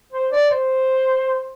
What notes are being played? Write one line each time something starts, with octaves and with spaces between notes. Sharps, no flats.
C5
D5
C5